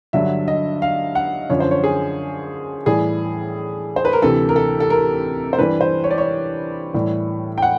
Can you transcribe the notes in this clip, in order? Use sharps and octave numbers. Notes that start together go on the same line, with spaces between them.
G2 D3 F#3 E5
D#5
F5
F#5
F#2 D3 F3 C#5
C5
C#5
G#4
A2 E3 G3 G#4
C5
B4
A#4
D2 C3 E3 A4
A#4
A4
A4
A#4
C5
G2 E3 G3 B4
C5
C#5
D5
C#5
A2 E3 G3
G5
F#5